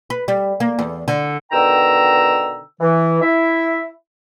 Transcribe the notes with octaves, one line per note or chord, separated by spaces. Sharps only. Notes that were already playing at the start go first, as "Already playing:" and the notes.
B4
G3
A#3
E2
D3
B2 D3 D#3 G5 A#5 E6
E3
E4 E5